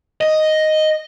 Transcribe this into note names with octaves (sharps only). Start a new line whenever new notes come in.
D#5